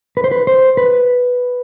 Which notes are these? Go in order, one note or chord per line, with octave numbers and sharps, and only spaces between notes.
B4
C5
B4
C5
B4